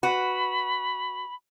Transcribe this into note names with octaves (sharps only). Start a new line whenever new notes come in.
F#4 B4 B5